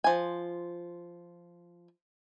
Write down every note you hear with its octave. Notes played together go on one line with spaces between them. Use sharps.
F3 G#5